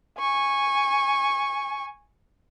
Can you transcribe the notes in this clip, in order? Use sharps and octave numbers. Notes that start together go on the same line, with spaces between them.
G#5 C#6